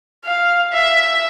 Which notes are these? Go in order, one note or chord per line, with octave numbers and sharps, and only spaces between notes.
F5
E5